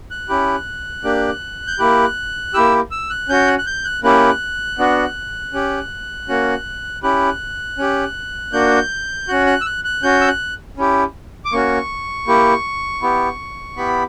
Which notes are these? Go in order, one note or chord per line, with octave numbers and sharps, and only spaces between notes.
F#6
C#4 E4 G4
A#3 D4 G4
G6
A#3 E4 G4 F#6
A#3 E4 G4 E6
E6
F#6
C#4 F#4 G6
F#6
F#6
G6
F#6
A#3 C#4 E4 G4 F#6
B3 D4 F#4
C#4 G4
A#3 C#4 F#4
C#4 E4 G4 F#6
C#4 G4
A#3 D4 F#4 G6
C#4 F#4 F#6
F#6
E6
F#6
F#6
C#4 F#4 G6
E6
F#6
C#4 E4 G4
D6
A#3 C#4 F#4 C#6
A#3 E4 G4
B3 E4 G4
B3 E4 G4 B5